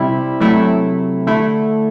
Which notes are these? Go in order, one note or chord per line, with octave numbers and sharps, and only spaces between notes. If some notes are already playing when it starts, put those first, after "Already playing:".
Already playing: C3 G3 C4 E4
C3 F#3 A3 E4
D3 A3 E4